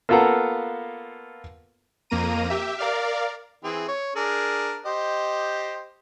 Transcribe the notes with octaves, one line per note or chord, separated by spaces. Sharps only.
A#3 B3 F4 A4 F#5 A#5
F2 A#3 A#5 D#7
G4 E5
A#4 D5 F5
E3 C4 G#4
C#5
D4 G#4 A#4
G4 C5 D#5